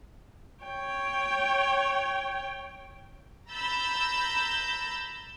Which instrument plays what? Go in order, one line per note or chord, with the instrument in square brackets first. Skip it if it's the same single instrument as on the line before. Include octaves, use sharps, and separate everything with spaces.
[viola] C#5 G5
[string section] A#5 B5 E6 G6 A6